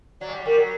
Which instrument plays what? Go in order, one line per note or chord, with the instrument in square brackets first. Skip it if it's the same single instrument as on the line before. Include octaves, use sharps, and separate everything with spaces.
[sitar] F#3 [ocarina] D5
[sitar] G#3
G3
[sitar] G3 [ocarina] A#4
[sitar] F#3